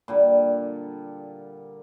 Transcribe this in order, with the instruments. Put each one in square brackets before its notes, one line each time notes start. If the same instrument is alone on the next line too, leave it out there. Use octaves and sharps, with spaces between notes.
[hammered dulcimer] A#2 D3 G3